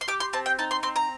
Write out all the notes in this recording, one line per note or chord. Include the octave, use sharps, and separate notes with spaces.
C6
G4 D6
C6
C4 A5
G5
D#4 A5
C6
C4 C6
A#5